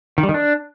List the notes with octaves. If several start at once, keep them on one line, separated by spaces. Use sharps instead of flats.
D#3
G3
D#3
D4